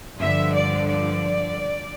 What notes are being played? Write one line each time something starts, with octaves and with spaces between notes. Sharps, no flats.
G2 D3 F3 E5
D5
D5